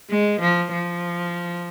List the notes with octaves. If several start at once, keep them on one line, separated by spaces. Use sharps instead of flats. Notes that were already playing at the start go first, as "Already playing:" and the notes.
G#3
F3
F3